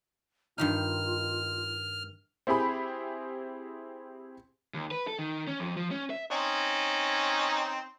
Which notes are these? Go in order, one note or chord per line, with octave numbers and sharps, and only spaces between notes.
G2 D#3 D#4 F4 F6
C4 E4 G4 G#4 B5
D#2
B4
A4
D#3
C#4
F2
F3
C#4
E5
C4 C#4 D#4